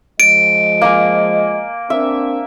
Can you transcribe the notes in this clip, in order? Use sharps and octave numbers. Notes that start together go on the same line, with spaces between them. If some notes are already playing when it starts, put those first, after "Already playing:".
F3 G#3 D#5 D7
A#3 G#5
C4 D4 A#4 E5